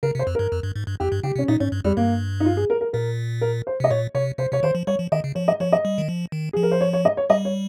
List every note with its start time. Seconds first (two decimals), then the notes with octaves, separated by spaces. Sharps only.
0.03 C#3 A#4
0.15 C3
0.19 C5
0.27 F2
0.35 G2 A#4
0.52 F2
0.63 G2
0.76 G#2
0.87 G2
1.00 F2 G4
1.12 G2
1.23 C#3 G4
1.36 C3 C#4
1.48 A#2 D#4
1.60 G#2 C#4
1.72 G2
1.84 F2 G3
1.97 G2 A#3
2.40 D#4
2.45 F4
2.57 G#4
2.70 A#4
2.81 A#4
2.93 A#2 A#4
3.41 A#4
3.67 C5
3.80 C3 D#5
3.90 A#2 C#5
4.15 C3 C#5
4.38 C3 C5
4.51 C3 C#5
4.63 D#3 C5
4.75 F3
4.87 G3 C#5
4.99 F3
5.12 D#3 D#5
5.24 C#3
5.35 F3 C#5
5.48 D#5
5.60 F3 C#5
5.72 D#5
5.85 G3
5.98 D#3
6.09 F3
6.32 D#3
6.53 F3 G#4
6.63 A#4
6.72 C5
6.81 C#5
6.93 C#5
7.05 D#5
7.17 C#5
7.30 G3 D#5
7.45 C#5